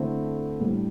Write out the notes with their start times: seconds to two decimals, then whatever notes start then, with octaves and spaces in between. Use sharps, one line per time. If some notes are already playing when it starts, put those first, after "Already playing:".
Already playing: D3 A3 C4 E4
0.60 A2 G3 D4